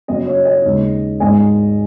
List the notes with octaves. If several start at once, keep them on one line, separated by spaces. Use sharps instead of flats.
F#1 F#2 F#3 D#5
C#5
D#5
D#2 C#3 G#3
G#1 G#2 G#3 D#5 G#5